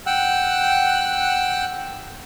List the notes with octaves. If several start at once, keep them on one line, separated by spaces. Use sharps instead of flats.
F#5 G5 E6 F#6